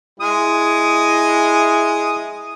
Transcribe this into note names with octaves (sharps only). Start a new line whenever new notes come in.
G#3 E4 D#6